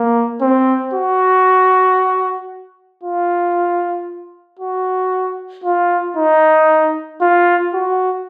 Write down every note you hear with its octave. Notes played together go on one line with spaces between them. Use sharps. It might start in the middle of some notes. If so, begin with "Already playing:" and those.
Already playing: A#3
C4
F#4
F4
F#4
F4
D#4
F4
F#4